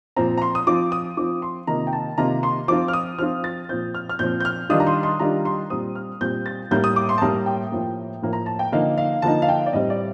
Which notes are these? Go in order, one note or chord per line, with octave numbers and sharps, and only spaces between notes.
A#2 F3 C4 A#5
A#5
C6
D#6
F3 C4 F4 D6
D#6
F3 C4 F4 D6
C6
C3 D#3 A#3 F4 A#5
G5
A5
C3 D#3 A#3 F4 A#5
C6
F3 C4 F4 D6
F6
D#6
F3 C4 F4 F6
A6
A#2 F3 C4 G6
F6
F6
A#2 F3 C4 G6
G6
F6
D#3 G3 D4 F4 D#6
A#5
C6
C6
D#3 G3 D4 F4 A#5
C6
A#2 G3 C4 D#6
F6
A#2 G3 C4 G6
A6
A2 G3 A#3 G6
D#6
D6
C6
A5
A2 G3 A#3 A#5
G5
A2 F3 A#3
A2 F3 A#3
A#5
A5
G5
D3 F3 A#3 D#4 F5
F5
D3 F3 A#3 D#4 A5
F5
G5
D5
A2 G3 C4 D#5
D5